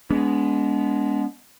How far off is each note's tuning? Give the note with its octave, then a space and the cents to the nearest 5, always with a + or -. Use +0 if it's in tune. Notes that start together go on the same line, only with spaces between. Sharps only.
G#3 +0 B3 +0 D4 -40